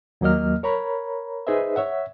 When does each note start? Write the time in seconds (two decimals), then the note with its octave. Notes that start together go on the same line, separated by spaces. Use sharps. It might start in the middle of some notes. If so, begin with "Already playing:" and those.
0.21 D#2 F#3 A#3 D#5 F6
0.63 A#4 C#5 A#5 B5
1.47 D#4 G#4 B4 C5 D#5 E5
1.76 C#5 E5 F#5